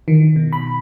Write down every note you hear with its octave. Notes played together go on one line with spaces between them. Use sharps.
D#3
B2
B5